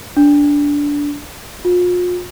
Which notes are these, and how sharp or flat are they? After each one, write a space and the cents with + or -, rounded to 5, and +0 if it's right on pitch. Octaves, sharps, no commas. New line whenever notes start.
D4 -15
F4 +40